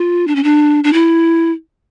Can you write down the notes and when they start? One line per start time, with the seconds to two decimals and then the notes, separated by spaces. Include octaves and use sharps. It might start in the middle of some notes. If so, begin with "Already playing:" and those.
Already playing: F4
0.27 D4
0.36 C#4
0.43 D4
0.84 D4
0.93 E4